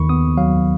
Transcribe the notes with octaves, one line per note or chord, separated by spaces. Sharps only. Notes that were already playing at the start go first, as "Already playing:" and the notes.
Already playing: D#2 D#3 B5 C#6
B3 D#6
F#3 F5